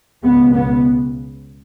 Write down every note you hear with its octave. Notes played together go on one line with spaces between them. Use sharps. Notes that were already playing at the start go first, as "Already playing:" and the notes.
C#2 B2 B3
B3